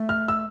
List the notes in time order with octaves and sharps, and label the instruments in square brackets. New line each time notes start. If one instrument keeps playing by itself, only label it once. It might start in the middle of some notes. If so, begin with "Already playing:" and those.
Already playing: [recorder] A3
[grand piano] F6
E6